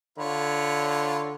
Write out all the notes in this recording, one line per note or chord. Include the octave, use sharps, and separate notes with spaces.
D3 F4 C#5 B5